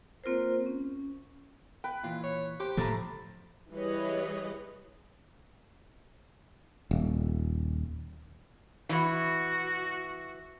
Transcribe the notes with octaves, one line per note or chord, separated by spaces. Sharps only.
A#3 C4 F4 A#4 C5
C#4
B4 G5
A#2 E3 F4
C#5
G4 C5
A2 F3 A3 A4 C5 A#5 B5
E3 G3 G#4 B4 C#5 D#5
D#1
E3 F#4